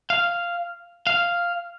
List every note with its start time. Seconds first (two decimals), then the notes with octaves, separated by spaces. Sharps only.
0.10 F5
1.07 F5